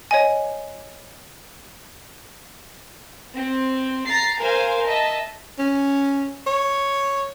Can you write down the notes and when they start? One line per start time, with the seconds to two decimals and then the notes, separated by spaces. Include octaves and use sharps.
0.11 C#5 D#5 G#5
3.35 C4
4.06 A#5 A6 C7
4.39 A#4 C5 F5 G#5
4.87 D#5 E5 A5
5.58 C#4
6.47 C#5